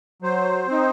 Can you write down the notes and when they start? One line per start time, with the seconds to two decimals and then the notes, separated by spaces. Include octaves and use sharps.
0.22 F#3 C5
0.68 C4 D#4